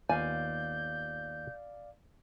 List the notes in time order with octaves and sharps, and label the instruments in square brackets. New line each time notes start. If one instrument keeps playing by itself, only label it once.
[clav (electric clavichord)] D#2 B3 F4 [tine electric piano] D5 F5 [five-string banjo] G#5 [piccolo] G6